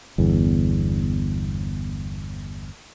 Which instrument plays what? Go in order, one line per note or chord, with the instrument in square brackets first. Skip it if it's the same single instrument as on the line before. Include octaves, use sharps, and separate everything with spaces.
[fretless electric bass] G1 E2